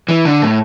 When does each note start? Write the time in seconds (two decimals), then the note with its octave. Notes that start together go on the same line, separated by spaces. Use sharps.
0.09 E3
0.25 D3
0.42 A2